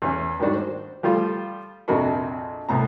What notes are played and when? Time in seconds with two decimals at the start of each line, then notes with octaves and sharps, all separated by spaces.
0.02 E2 C#4
0.40 G#2 D#3 G3 D4 F#4
0.54 C5
1.03 F3 G3 A3 F4
1.88 A#1 F2 C3 F#4 A#4 B5
2.69 C2 A2 B3 A#5